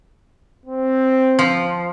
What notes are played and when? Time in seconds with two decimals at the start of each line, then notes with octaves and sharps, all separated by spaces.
0.66 C4
1.39 F3